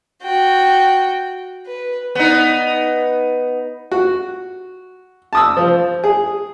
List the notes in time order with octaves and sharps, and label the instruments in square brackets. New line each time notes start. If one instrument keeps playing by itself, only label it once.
[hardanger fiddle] F#4 G5
B4
[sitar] B3 D#4
[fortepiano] F#4
A5 D#6 E6
F3
G#4